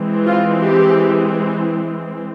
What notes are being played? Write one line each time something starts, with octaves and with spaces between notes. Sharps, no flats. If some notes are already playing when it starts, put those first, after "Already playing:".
Already playing: E3 G#3 C4
F4
G4